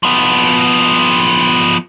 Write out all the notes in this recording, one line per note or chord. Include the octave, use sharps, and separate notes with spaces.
F3 B3